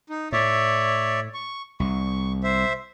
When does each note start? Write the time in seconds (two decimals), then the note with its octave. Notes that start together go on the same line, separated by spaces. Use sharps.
0.09 D#4
0.32 A2 C#5 D5 E5
1.34 C#6
1.80 C2 C#6
2.43 C5 E5